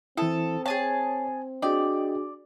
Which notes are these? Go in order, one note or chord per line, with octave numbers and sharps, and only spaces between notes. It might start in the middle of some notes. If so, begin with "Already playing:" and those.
E3 C4 E4 A4 D#6
G#4 C#5 G#5 A5
D4 F#4 G#4 D5 D#5 G5